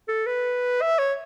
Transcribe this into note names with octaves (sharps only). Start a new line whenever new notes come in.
A4
B4
E5
C#5